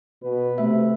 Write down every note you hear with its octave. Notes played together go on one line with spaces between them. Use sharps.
B2 B4
C3 A3 E5